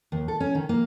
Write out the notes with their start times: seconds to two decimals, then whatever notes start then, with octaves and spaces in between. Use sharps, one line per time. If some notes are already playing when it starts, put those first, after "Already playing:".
0.12 D#2
0.28 A4
0.40 C#4
0.55 D#3
0.69 A#3